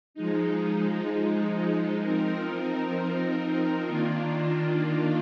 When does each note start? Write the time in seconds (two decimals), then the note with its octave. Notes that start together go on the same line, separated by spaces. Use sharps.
0.14 F3 G#3 D#4
2.02 F3 C4 D#4 A#4
3.88 D#3 A#3 D4 F4